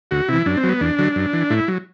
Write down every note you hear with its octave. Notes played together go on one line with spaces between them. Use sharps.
D2 F#4
C3 E3 E4
F#2 D4
C4
F#3
B3
E2 D4
D3 F#3
F#2
E3
A2 E4
F#3